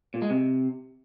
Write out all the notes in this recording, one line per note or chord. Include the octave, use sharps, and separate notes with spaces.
A#2
G#3
C3